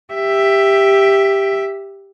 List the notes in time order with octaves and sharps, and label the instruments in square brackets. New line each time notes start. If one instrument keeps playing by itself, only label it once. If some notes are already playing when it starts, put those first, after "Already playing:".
[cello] G4 E5